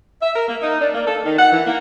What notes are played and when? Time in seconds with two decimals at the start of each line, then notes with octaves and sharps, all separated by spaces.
0.22 E5
0.35 A#4
0.48 A#3
0.62 D#4
0.81 D4
0.94 A#3
1.07 A4
1.25 D#3
1.37 F#5
1.52 E3
1.66 A#3